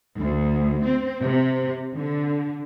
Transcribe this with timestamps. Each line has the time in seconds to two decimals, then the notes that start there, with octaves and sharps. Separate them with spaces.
0.19 D2
0.83 C4
1.23 C3
1.95 D3